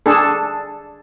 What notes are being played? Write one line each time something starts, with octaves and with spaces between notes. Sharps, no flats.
D4 G#4 A4